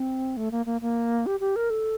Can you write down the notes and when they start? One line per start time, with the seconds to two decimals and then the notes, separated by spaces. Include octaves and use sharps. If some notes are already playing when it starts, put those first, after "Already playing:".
Already playing: C4
0.37 A3
0.51 A#3
0.66 A#3
0.81 A#3
1.26 G4
1.40 G4
1.56 A#4
1.70 A4